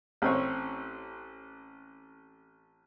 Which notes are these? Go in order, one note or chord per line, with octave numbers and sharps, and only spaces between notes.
A1 C4 C#5